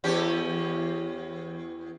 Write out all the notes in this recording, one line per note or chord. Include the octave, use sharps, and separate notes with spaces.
E2 C#4 G4